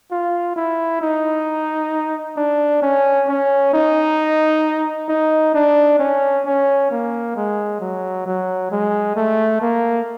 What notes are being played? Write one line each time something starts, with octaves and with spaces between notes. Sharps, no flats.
F4
E4
D#4
D4
C#4
C#4
D#4
D#4
D4
C#4
C#4
A#3
G#3
F#3
F#3
G#3
A3
A#3